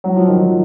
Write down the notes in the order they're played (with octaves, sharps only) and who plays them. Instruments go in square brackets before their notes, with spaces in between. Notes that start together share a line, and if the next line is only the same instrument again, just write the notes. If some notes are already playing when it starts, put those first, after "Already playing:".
[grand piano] F#3
F3
D#3
F3